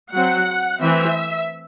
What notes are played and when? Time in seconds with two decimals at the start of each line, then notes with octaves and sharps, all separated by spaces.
0.13 F#3 C4 F#5
0.81 E3 A3 C4 E5